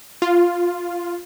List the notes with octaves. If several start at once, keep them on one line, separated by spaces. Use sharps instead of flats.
F4